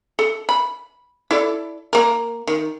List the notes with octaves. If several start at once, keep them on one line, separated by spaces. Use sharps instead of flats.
A4
B5
E4 A4 D5
A#3 A#4
D#3